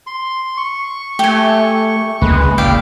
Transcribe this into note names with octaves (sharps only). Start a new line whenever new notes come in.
C6
C#6
A3 G4 G#5
C#2 G#3 A#3 B4
G#1 E4 D5 F5 G5